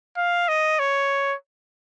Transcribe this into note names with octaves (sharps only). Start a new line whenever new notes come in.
F5
D#5
C#5